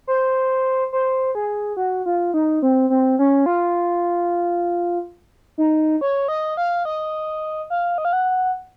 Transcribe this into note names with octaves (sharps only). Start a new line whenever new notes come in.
C5
C5
G#4
F#4
F4
D#4
C4
C4
C#4
F4
D#4
C#5
D#5
F5
D#5
F5
D#5
F5
F#5